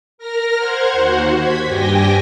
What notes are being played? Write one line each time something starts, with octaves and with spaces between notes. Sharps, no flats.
A#4 F6 A#6
C5 F#5 G#6
D#2 F#4 C5
G#6 B6
G2 G4 G5 G#5 A#6